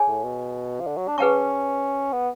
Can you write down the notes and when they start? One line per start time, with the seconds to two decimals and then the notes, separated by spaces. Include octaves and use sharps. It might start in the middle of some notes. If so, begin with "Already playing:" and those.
Already playing: D4 G#4 C#5 G#5
0.08 A2
0.24 B2
0.80 F3
0.87 D3
0.97 F#3
1.08 D4
1.18 C#4 G#4 B4 F#5 A5 C#6
2.13 B3